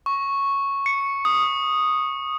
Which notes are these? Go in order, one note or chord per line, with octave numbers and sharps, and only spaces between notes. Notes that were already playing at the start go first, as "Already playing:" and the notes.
C#6
C#7
D#6